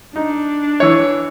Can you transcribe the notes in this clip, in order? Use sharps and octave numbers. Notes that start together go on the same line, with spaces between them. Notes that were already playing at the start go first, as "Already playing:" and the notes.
D4 D#4
E3 C#5